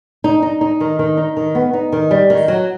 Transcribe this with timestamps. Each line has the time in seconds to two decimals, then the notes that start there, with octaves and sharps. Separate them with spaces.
0.24 D#4
0.42 D#4
0.61 D#4
0.80 D#3
0.99 D#3
1.17 D#4
1.37 D#3
1.55 B3
1.73 D#4
1.92 D#3
2.11 G3
2.30 D#3
2.48 F#3